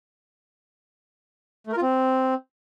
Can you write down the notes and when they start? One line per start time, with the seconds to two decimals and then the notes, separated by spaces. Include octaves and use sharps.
1.67 A3
1.72 A#4
1.77 F4
1.82 C4